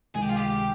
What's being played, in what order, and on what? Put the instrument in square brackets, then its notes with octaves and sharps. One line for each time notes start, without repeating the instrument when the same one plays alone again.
[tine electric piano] C#2 C3 D#3 G#3 D#4 [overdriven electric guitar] G#4
[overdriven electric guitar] G4
F4
G4